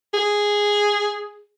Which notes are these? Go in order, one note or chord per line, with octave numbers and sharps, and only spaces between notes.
G#4